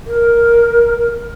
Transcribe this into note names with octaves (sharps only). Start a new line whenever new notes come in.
A#4